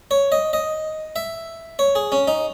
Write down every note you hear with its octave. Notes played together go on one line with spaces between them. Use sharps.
C#5
D#5
D#5
E5
C#5
G#4
C#4
D#4